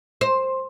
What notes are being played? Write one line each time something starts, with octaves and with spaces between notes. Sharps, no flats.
C5